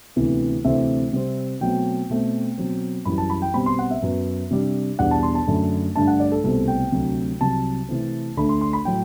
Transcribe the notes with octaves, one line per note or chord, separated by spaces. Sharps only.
D2 C3 E3 B3
D2 C3 E3 A3 C4 E5
C3 G3 C4
B2 F#3 A3 C4 G5
B2 A3 C4
B2 F#3 C4
F#2 E3 G3 B5
A5
B5
G5
B2 G3 C4 B5
C6
F#5
E5
F#2 F#3 B3
C3 G3 D4
E2 B2 G3 D4 F#5
A5
C6
A5
F#2 D3 A3
G2 D3 A3 D4 A5
F#5
D5
A4
C2 B2 A3 C4 A4
G5
D2 C3 F#3
C2 C3 F#3 A5
C3 E3 A3 C4
D2 D3 A3 D4 B5
C6
C6
B5
A2 F#3 G5